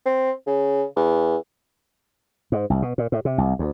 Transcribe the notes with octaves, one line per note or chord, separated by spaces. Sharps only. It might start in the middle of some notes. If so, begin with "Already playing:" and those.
C4
C#3
E2
G#2
C2
B2
A#2
A2
C3
C2
D2